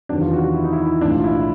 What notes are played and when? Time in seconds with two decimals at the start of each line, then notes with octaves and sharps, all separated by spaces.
0.09 E2 C3 D#3 F#3 D4
0.21 F4
0.33 F#4
0.56 E4
0.64 D#4
0.73 E4
1.01 B1 A2 E3 G#3 D4
1.12 F4
1.24 E4
1.35 E4